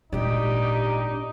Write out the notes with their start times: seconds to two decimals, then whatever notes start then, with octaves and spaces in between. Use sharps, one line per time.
0.13 G#1 A#2 D4 D#4 G4 D5